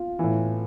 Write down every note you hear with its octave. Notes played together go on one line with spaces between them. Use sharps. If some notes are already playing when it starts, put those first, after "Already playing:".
Already playing: F4
A2 E3